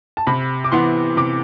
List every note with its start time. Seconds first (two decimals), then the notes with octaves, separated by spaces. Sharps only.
0.17 A5
0.27 C3 B5
0.64 D6
0.72 E3 B3 C6
1.17 C3 D6